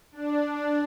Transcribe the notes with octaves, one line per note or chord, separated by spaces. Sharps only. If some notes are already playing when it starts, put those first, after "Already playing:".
D4